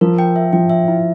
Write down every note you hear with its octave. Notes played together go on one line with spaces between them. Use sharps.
F3 A#4
G5
E5
F3 G5
E5
E4